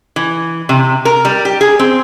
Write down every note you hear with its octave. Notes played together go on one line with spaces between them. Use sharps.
E3
C3
A#4
G3
G4
G#4
C4